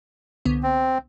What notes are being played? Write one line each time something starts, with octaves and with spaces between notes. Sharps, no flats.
C2 D3 B3
C4